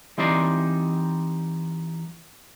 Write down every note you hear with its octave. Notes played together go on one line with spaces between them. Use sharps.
E3 G3 C4 D#4 C5 D5